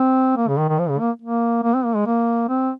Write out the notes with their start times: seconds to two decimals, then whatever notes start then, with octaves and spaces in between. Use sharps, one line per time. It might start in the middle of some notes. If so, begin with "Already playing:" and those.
Already playing: C4
0.37 A#3
0.48 C#3
0.58 D#3
0.69 D#3
0.79 F3
0.89 C#3
1.00 A#3
1.22 A#3
1.63 A#3
1.74 C4
1.85 A#3
1.96 G#3
2.07 A#3
2.49 C4